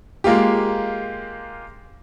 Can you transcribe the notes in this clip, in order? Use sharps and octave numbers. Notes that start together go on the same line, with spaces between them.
G#3 A#3 F4 G4